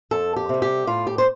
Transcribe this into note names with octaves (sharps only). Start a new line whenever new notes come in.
F2 A4
G4
C3 G3
G4
A2 F4
G4
C5